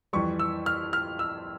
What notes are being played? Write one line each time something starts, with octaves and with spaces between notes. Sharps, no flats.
F2 E3 G3 C#6
E6
F6
F6
E6